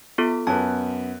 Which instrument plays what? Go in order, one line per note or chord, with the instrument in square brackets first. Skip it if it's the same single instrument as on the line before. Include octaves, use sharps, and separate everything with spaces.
[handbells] B3 F4 A4
[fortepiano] F#2 B3 [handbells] A5